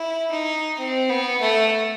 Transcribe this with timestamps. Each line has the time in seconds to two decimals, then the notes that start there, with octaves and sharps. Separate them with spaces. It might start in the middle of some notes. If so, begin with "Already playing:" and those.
Already playing: E4
0.31 D#4
0.78 C4
1.10 B3
1.41 A3